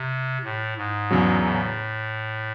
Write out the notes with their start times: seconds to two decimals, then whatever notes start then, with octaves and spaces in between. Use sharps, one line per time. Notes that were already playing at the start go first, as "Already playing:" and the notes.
Already playing: C3
0.44 A2
0.77 G#2
1.11 E2 C#3 F#3
1.44 A2